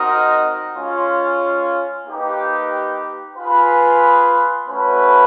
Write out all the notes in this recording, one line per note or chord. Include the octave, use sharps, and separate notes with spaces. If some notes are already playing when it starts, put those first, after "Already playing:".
Already playing: C4 D#4 F#4 A#4 D#5
G#3 C#4 F4
A#3 D#4 G4 B4
F4 G#4 B4
A3 C#4 F#4 B4